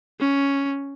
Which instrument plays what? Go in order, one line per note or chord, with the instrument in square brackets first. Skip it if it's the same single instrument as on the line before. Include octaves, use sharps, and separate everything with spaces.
[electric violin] C#4